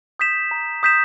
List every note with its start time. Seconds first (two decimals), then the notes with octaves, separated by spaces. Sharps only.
0.19 D#6 G6 B6 E7
0.51 A#5
0.83 D#6 G6 B6 E7